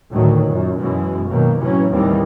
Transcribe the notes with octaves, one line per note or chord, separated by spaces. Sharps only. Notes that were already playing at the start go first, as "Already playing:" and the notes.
D2 A2 D#3 F#3
F#2 A#2
F#2 B2 E3 G#3
B2 D#3 F#3 A#3
A2 C3 E3 F#3 C#4
D#2 A2 D#3 E3 G3 C4